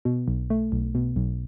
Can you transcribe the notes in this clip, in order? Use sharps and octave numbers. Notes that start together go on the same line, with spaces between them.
B2
B1
A3
B1
B2
B1